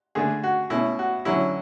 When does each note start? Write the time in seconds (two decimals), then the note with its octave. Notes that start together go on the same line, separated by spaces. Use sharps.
0.15 D3 A3 D4 G#4
0.44 F#4
0.70 B2 A3 C#4 E4
0.99 F#4
1.25 D3 F#3 C#4 E4